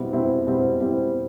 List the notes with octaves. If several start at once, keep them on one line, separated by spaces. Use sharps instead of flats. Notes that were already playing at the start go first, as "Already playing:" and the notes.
Already playing: B2 G3 C4 E4
B2 G3 C4 E4
B2 G3 C4 E4
B2 G3 C4 E4